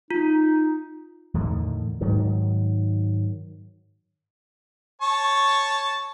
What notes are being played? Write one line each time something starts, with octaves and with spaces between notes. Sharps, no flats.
D#4 F4
E2 A2 D3 D#3
G#2 D#3 F#3
C#5 A5 C#6